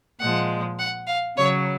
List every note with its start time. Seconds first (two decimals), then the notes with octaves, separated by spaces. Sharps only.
0.20 A#2 F3 G#3 F#5
0.79 F#5
1.08 F5
1.38 C#3 F#3 C#5